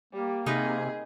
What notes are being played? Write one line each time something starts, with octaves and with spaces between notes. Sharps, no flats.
G3 A#3
C3 D#4 G#4 A#4 B4